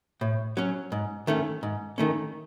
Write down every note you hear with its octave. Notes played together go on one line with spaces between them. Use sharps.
A2
F#3 C#4
G#2
D#3 A3 C#4
G#2
D#3 A3 C#4